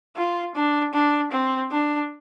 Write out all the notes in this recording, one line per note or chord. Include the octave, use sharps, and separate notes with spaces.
F4
D4
D4
C4
D4